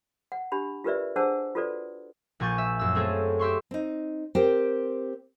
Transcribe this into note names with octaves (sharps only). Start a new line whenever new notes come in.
F#5
D4 G4 B5
F4 G4 A#4 B4 D5 E5
D4 G#4 C5 F#5 A5 E6
F4 F#4 A4 B4 D5
A#1 A#2 G#5 C#6 G6 A6
E5
F#2 E6
A3 A#3 C4 G#4 A4 C#5
G4 E5 C6 C#6
C4 D#4
C4 G4 A#4 C5 G5